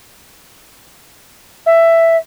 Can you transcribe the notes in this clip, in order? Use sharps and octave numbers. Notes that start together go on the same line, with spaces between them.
E5